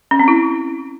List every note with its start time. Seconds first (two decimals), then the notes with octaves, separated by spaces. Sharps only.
0.11 C#4
0.19 C4
0.28 E4